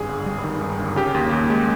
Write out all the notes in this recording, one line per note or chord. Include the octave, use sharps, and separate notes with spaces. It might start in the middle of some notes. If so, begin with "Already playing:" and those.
Already playing: G#1 G2 G#4
G1
G3
D#3
G2
G1
C#3 G4
D#2
D#2
G#3